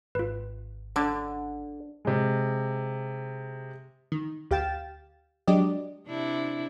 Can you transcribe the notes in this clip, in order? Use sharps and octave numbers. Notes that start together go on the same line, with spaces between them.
G#1 F4 B4
D3 D4
C3 G#3
D#3
D2 G4 F5 G5 A6 E7
F#3 G#3 D4 G4 D5 D#5
C3 D4 E4